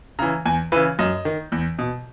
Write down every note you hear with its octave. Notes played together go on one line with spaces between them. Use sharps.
C#3 E3 A#5
E2 G#5
C#3 E3 B4
F#2 D#5
D#3
E2
B2